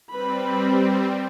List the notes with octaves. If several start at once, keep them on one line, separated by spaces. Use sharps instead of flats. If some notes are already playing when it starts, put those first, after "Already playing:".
G3 C4 B4 B5